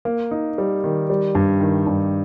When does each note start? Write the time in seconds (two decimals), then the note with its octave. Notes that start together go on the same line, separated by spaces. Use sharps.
0.05 A#3
0.31 D#4
0.58 G3
0.84 D#3
1.10 G3
1.35 G2
1.60 D#3
1.87 G2